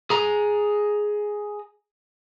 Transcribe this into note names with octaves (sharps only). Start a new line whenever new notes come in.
G#4 A#5